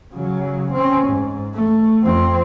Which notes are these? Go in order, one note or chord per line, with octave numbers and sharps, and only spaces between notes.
C#3 F#3
C4 C#4
G#2
A3
F2 C4